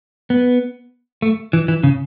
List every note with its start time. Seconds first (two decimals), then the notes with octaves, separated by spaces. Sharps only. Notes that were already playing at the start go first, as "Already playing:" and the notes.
0.30 B3
1.22 A3
1.53 E3
1.68 E3
1.83 C#3